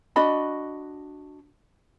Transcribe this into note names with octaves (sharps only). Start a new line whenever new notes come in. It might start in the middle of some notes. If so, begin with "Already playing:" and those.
D4 F#4 D#5 B5